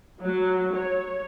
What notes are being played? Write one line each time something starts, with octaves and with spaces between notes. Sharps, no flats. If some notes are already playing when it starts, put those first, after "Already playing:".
F#3
C#5